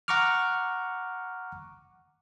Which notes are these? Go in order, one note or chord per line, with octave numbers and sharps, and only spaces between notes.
F#5 A#5 C#6 D6 F6